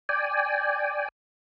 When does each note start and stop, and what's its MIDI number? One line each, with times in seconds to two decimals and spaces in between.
0.09 1.08 74
0.09 1.08 79
0.09 1.08 80